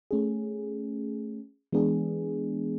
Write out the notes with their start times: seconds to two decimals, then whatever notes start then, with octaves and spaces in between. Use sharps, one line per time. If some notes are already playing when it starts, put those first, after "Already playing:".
0.11 A3 C#4 G#4
1.72 E3 G#3 B3 D4 G#4